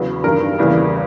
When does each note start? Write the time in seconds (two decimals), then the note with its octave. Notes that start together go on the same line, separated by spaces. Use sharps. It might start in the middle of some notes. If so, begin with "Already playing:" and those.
Already playing: E2 C#3 F#3 B3
0.24 G2 D#3 G3 A#4
0.59 E2 C#3 E3 G3 A#3